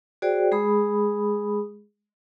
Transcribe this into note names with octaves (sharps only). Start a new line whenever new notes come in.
F#4 G#4 C5 D5 G5
G#3 G#4 B5 D#6